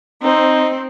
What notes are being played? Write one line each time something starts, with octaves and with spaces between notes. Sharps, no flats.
C4 D#4